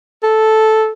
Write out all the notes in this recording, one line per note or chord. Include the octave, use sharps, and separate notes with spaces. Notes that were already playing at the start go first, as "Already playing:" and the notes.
A4